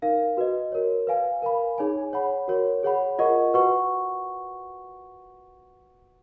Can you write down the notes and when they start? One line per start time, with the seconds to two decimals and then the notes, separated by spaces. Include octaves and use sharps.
0.02 D#4 A#4 F5
0.37 F#4 B4 D#5
0.72 F#4 A#4 C#5
1.07 B4 F5 G#5
1.42 A#4 F5 G#5 B5
1.78 D#4 G#4 C#5 G#5
2.13 C#5 F#5 B5
2.48 F#4 A#4 C#5
2.83 G#4 C#5 F#5 B5
3.19 F4 A#4 D#5 F#5 C#6
3.54 F#4 B4 F#5 C#6